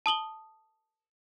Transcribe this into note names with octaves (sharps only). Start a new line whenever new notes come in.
A5 D#6 F#7 G7